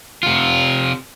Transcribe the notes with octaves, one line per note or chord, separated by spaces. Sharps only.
C3 F4